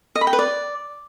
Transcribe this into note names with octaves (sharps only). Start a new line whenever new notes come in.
D#5
B5
G5
B4
D5